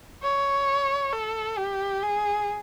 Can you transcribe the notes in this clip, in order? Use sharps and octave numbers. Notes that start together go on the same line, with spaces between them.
C#5
A4
G4
G#4